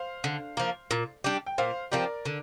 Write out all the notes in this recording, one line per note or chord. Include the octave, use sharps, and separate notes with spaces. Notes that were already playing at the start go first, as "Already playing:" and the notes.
Already playing: C5 F5
D3
F3 A#3
A#2
G3 D4 G4
G5
A#2 C5 F5
F3 C4 G4 A#4 D5
D3